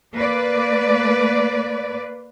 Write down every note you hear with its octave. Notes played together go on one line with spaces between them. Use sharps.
A#3 B4 D5